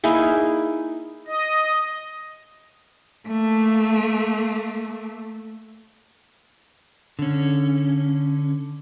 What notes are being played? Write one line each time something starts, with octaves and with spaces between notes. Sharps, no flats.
A#3 D#4 E4 G#4
D#5
A3 A#3
D3 C#4